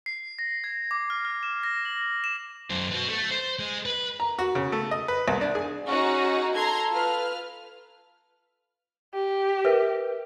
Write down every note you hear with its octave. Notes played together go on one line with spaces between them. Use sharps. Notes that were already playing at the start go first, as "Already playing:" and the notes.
C7
A#6
G#6
D6
F6
F6
E7
A#6
F#7
E7
F#2 C5
B3 F#4
A3
C5
G#3
B4
A#5
F#4
C#3
A3
D#5
B4
C2
D4
G#4
C#4 D#4 F#4 G#4
A4 A#5 C6 G#6
F4 B4 F6
G4
A#4 B4 E5